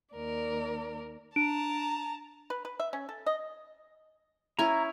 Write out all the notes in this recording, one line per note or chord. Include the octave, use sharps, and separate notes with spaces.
D#2 A#4 D5
D4 A5 A#5 D7
B4
B4
E5
C#4
A4
D#5
C#4 E4 G#5 A#5